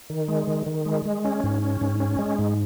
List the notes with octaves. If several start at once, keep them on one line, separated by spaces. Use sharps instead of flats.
D#3
G#3
D#3
D#3
G#3
G#3
C#4
G#2
C#4
G#2
C#4
G#3
G#2